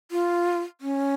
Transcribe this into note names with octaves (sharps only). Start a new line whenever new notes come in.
F4
C#4